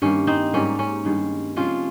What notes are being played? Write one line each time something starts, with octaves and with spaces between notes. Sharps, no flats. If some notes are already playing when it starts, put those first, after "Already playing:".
G2 D#3 A#3 C#4
C4 D#4
G#2 G3 A#3 C#4
C#4
G2 D#3 G#3
C3 F3 G#3 C#4 F4